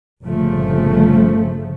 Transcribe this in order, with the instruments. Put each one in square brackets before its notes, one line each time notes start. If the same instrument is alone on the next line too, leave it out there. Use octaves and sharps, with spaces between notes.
[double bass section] G1 A#2 C#3 F3 A3